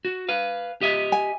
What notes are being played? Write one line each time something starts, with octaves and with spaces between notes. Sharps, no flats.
F#4
B4 F5
G4 D#5 E5
G#5